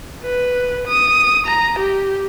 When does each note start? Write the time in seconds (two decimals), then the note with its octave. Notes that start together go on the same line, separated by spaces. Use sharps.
0.24 B4
0.88 D#6
1.46 A#5
1.79 G4